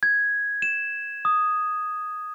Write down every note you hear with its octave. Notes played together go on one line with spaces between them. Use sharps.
G#6
E7
D#6